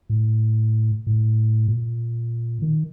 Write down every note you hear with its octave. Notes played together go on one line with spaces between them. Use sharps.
A2
A2
A#2
D#3